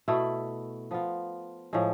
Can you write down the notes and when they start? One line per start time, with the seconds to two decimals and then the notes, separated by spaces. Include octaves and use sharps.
0.08 B2 A3 E4
0.91 F3 B3 F4
1.73 A2 F3 G#3